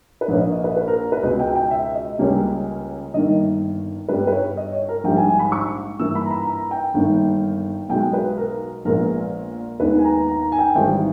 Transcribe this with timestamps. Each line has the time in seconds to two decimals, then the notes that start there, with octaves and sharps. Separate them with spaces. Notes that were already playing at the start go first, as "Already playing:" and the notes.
0.21 B4
0.28 A#1 A#2 A#3 C#5
0.40 D#5
0.52 D#5
0.64 B4
0.76 B4
0.88 A#4
1.12 B4
1.23 C#2 B2 G#3 D#5
1.39 G5
1.55 G5
1.71 E5
1.95 D#5
2.19 C#2 C#3 G3 A#3 C#5
3.14 G1 G2 D#3 A#3 D#5
4.09 G2 G3 B3 B4
4.27 B4
4.32 C#5
4.57 D#5
4.72 C#5
4.89 A#4
5.04 A#1 G#2 G3 G5
5.17 G#5
5.28 G#5
5.39 B5
5.52 C#6
5.99 G2 E3 A#3 E6
6.15 B5
6.25 A#5
6.31 B5
6.46 A#5
6.71 G5
6.94 G1 G2 D#3 A#3
7.89 B1 B2 G#3 G5
8.13 B4
8.37 A#4
8.85 A#1 A#2 G#3 B3 A#4
9.80 D#2 D#3 G#3 B3 B4
9.99 G#5
10.04 A#5
10.28 A#5
10.52 G#5
10.59 G5
10.66 G#5
10.75 G#1 G#2 E3 G3 G5